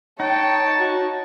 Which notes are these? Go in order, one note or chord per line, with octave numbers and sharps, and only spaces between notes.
D#4 C#5 G5 A5
F#4